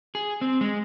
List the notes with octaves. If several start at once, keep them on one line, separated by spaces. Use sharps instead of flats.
G#4
C4
G#3